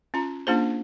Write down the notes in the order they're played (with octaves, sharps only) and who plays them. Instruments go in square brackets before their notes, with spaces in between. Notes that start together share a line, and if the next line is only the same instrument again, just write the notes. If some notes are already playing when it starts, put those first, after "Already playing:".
[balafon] C#4 F4 A#5
A#3 C#4 D4 F4 G#4 C5